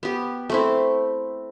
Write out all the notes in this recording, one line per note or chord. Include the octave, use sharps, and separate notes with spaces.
B3 G4
A3 C4 E4